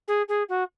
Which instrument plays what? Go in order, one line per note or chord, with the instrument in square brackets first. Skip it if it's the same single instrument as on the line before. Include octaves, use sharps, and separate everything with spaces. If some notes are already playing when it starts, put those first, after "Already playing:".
[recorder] G#4
G#4
F#4